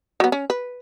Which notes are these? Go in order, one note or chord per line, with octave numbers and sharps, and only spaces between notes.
F#3 B3
C#4
B4